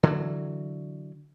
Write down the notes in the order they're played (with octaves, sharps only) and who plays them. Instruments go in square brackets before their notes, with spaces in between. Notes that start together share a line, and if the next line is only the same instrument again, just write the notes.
[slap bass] D3 E3 F#3